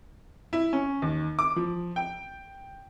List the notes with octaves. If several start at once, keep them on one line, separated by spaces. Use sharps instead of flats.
E4
C#4
D#2
D6
F3
G5